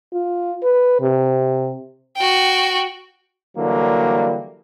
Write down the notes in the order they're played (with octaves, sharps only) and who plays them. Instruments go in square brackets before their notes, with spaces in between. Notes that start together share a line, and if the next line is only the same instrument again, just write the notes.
[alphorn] F4
B4
C3
[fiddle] F#4 G5
[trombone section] D3 E3 F#3 G3 A#3